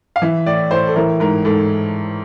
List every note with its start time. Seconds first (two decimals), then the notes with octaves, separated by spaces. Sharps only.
0.16 F5
0.22 E3 E5
0.46 A2 D5
0.71 A2 C5
0.87 A4
0.96 E3 A#4
1.20 G#2 A#4
1.45 G#2 A4